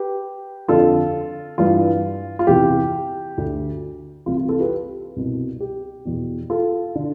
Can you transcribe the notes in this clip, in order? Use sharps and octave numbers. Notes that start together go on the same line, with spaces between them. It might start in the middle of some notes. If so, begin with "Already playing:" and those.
Already playing: G4 B4
F2 D3 F4 A4
G2 E3 F4
F4
E2 C3 E3 G4
D2 D3
C2 C3 E3 F4
F4
F4 A4
G4 B4
C2 B2
G4
E2 B2
F4 A4
D3